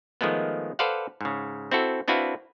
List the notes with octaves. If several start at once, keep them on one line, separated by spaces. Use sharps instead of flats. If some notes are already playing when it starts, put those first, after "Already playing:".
D#3 F3 G#3 A3 B3
A4 B4 C5 D5 F5 F#5
G#2 C#3
C4 E4 F#4 A4
C4 D4 E4 F#4 B4 F5